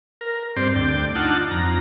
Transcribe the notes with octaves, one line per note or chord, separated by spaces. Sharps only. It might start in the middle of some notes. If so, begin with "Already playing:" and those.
A#4
G2 C4 C5 D5
D2 D5 G5
D4 D#4 F4 F#5 A5
F2 A#5